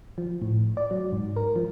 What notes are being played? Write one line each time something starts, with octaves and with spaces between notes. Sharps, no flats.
F3
A2
D5
F#3
G#2
A#4
F3